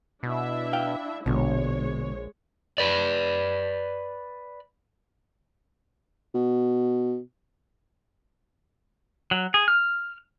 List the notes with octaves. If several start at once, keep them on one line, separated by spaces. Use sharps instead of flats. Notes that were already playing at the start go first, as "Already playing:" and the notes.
B2 D4 E4 E5
F5 G5
A#1 B2 D3 G#3 C#5
B4 D5
B2
F#3
G#4
F6